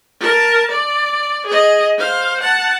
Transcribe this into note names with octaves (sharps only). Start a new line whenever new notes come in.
A#4 A5
D5
G#4 D#5
C5 F5
F#5 A5